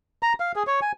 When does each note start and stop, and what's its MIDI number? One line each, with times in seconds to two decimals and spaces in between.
0.23 0.33 82
0.40 0.52 77
0.56 0.63 68
0.67 0.80 73
0.82 0.92 80